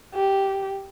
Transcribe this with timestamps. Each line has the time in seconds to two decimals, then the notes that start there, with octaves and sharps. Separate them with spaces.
0.14 G4